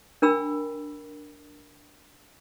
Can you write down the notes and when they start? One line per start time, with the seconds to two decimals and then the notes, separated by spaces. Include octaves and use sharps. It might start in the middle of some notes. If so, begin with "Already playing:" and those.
0.22 D4 A#4 G5 B5 E6